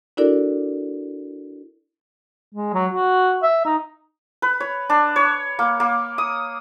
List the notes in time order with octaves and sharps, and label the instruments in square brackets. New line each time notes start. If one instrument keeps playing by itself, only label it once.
[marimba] D4 E4 F#4 A4 A#4 D5
[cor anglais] G#3
F#3
F#4
E5
D#4
[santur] B4
C#5
D4
C#5
A#3
A#3
D#6